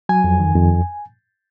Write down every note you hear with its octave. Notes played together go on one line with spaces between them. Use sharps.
F#3 G#5
F2
D#3
F2